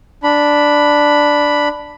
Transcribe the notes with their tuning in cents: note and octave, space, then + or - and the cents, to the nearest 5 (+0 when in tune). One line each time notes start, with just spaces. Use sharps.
D4 +0 B5 +0